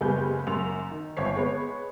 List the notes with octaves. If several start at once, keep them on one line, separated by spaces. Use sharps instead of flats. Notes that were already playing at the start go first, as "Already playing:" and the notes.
F#1 G3 G#3 B3 G#5 G6
F#1 F#2 C6 F7
D#3
G1 C4 C#5 C7
G#3 B3 C#5